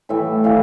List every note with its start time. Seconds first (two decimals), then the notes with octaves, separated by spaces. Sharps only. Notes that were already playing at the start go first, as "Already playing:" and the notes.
0.09 A2 E3 G3 E5
0.44 E3 G3 F5